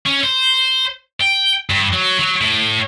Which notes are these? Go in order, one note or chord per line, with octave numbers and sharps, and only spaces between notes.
C#4
C5
G5
G2
F#3
F#3
A2